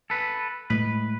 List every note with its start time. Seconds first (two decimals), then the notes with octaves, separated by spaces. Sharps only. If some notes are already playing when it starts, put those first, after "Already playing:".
0.10 A4 B4
0.70 A2 G#3 B4